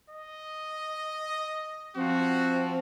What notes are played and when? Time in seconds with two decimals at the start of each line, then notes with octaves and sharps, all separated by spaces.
0.10 D#5
1.97 F3 C4 F#4